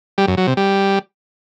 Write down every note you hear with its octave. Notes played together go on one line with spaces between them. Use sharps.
G3
F#2
F#3
C3
G3